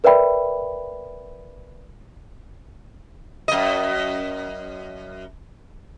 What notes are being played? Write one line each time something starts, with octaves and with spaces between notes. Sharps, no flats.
A#4 B4 D5 E5 G5 B5
F#2 D#5